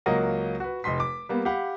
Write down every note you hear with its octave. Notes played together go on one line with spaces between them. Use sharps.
C#2 F#3 A#3 A#4 D#5 F#5
F#4 B4
F1 D#5 C6 B6
D6
G3 A#3 B3
G4 F5 F#5 B5